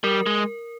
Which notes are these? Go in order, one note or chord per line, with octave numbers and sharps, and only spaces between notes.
G3 A#4
G#3